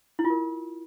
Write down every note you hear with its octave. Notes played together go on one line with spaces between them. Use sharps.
E4
F4
A#4